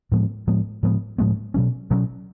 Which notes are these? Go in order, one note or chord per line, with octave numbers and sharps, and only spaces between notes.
A2 F3 G#3 B3
A2 F3 G#3 B3
A2 F3 G#3 B3
A2 F3 G#3 B3
B2 F#3 C#4
B2 F#3 C#4